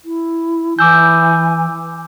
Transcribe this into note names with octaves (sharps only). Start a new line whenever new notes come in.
E4
E3 G#5 D6 E6 G6